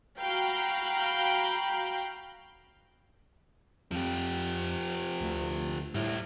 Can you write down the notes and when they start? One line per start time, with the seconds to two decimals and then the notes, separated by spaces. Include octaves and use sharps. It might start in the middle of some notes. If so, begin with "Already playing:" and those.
0.19 F#4 F5 G5 A#5 B5
3.91 F2 F3 G4
5.21 D2
5.94 A2 G3 E4